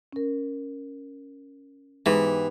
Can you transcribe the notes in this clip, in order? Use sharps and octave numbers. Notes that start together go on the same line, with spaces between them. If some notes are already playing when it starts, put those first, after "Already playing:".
C#4 A#4
G#2 E3 B3 G4